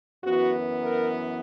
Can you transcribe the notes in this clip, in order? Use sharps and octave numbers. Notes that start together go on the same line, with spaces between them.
F#2 E3 B3 F#4
A#4